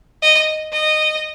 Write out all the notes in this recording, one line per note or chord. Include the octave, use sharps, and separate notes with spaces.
D#5
D#5